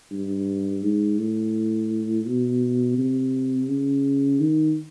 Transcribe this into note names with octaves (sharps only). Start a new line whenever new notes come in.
G2
G#2
A2
B2
C3
C#3
D#3